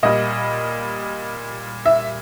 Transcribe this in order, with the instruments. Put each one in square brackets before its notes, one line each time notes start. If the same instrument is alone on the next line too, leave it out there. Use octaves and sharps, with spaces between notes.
[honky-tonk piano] A#2 G3 D#5
E5